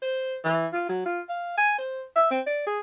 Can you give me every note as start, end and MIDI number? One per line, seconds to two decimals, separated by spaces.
0.02 0.36 72
0.44 0.67 52
0.73 0.87 65
0.89 1.05 54
1.06 1.21 65
1.29 1.57 77
1.58 1.75 80
1.79 2.02 72
2.16 2.27 76
2.31 2.40 60
2.47 2.64 74
2.67 2.80 68